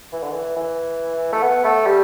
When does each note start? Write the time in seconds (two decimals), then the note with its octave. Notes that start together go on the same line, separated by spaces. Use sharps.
0.13 E3
0.23 D3
0.32 E3
0.56 E3
1.33 A3
1.43 B3
1.65 A3
1.86 G3